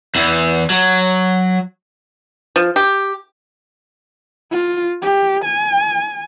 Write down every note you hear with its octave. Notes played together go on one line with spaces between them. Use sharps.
E2 E3
F#3
F3
G4
F4
G4
G#5